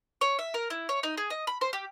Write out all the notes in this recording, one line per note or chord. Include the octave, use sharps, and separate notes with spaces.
C#5
E5
A#4
E4
C#5
D#4
G#4
D#5
B5
C5
G4